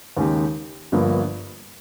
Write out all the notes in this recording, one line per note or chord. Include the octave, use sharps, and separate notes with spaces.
D#2 C#3 G#3 D#4 G4
G1 G2 F3 A#3